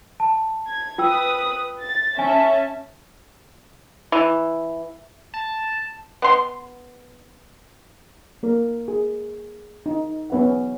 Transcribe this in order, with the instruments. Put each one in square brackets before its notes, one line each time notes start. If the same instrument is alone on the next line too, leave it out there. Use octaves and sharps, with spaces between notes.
[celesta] A5
[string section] G#6
[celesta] F4 G5 E6 [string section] B4 D#6
[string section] A6
[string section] C#4 E5 A5 [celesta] G#5
[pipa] E3
[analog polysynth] A5
[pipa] B3 C6
[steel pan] A#3 A#4
G#4
D#4
B3 C#4 B4 E5 F#5